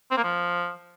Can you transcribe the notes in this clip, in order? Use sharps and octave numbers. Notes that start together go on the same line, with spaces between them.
C4
A#3
F3